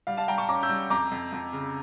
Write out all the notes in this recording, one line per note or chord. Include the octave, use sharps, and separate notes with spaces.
G3 F5
F5 A5
G3 G5 A#5
A5 C#6
C#4 A#5 D6
E6 G6
G3
F2 A#5 D6
F2
F2
C#3